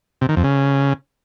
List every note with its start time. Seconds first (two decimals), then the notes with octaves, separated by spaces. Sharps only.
0.21 C3
0.29 D#3
0.36 F2
0.44 C#3